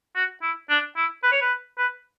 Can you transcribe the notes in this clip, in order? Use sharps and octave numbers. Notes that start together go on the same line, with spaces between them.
F#4
E4
D4
E4
B4
C#5
B4
B4